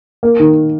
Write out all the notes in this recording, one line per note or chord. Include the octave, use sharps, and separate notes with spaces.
A#3
D#3